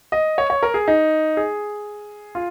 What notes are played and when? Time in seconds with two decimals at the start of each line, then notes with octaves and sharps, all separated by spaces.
0.12 D#5
0.38 C#5
0.50 C#5
0.63 A#4
0.74 G#4
0.88 D#4
1.37 G#4
2.35 F4